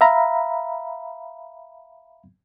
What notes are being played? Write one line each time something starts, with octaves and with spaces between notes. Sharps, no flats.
E5 F5 A#5 B5